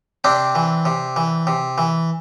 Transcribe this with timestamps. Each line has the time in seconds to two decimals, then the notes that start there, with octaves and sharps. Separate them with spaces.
0.24 C3 C4 D4
0.55 E3
0.85 C3
1.16 E3
1.47 C3
1.78 E3